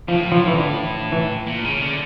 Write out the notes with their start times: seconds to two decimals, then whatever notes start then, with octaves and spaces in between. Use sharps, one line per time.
0.08 A2 F3
0.32 F3
0.47 E3
0.54 D3
1.12 E3
1.47 A#2
1.64 C#3
1.81 D3